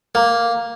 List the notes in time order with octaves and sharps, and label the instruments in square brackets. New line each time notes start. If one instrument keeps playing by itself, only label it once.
[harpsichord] A#3